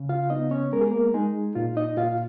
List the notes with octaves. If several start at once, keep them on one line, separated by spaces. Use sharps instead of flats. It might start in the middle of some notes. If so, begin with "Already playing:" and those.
Already playing: C#3
F4 F5
B3 D#4 D#5
C#4 C#5
G#3 A#4
G#4
A#3 A#4
G#3 D#4 G#4
A#2 F4
D#4 D#5
A#2 F4 F5